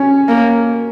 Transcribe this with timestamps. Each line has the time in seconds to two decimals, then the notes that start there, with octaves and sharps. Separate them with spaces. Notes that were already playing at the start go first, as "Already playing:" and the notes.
Already playing: C#4 C#5
0.29 A#3